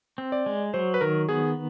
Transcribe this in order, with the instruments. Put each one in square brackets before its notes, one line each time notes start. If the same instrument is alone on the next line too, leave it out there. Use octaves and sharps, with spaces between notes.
[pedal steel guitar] C4
[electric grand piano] D5
[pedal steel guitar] G#3
[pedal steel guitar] F#3 [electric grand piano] C5
[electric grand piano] B4
[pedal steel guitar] D#3 [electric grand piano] A#4
[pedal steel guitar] B3 [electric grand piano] G#4